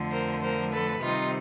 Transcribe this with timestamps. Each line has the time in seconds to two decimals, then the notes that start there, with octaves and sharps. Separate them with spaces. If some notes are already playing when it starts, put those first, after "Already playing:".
Already playing: F2 D3 F3 A3
0.11 A#4 C5
0.42 A#4 C5
0.72 A4 B4
1.03 C3 D#3 G3 C4 D#4 F4